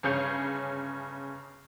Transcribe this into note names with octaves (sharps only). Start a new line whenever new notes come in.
G1 C#3 G#4 C#5 G6 C#7